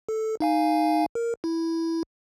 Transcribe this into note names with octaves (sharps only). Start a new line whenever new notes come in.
A4
D#4 F5 G#5
A#4
E4